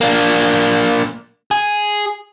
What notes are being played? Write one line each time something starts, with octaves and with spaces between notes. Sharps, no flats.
A#3 D4
G#4